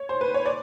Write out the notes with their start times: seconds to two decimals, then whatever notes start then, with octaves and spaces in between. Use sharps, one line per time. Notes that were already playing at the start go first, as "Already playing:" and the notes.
Already playing: C#5
0.09 C5
0.21 B4
0.34 C#5
0.46 D5